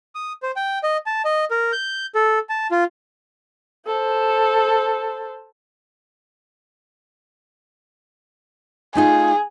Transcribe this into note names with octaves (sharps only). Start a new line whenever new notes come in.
D#6
C5
G5
D#5
A5
D#5
A#4
G6
A4
A5
F4
A4 C5
A3 D#4 F4 G#4